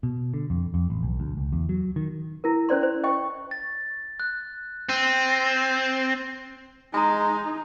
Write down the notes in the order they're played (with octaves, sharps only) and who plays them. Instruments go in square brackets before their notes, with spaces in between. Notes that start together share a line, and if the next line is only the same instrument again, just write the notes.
[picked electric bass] B2
D3
F2
F2
A1
B1
D2
C#2
E2
F#3
D#3
[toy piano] E4 A#4
C#4 C5 D5 C6
C5
D#5 G5 C#6
[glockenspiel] A6
F#6
[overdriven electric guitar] C4 [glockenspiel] E6 D#7
[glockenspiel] A6 A#6
[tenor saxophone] G#3 [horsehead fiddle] D#4 [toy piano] G#5 A#5